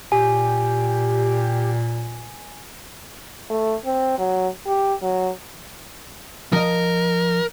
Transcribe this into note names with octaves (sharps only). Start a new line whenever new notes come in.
A#2 G4 G#5
A3
C4
F#3
G4
F#3
F3 A#4 D#5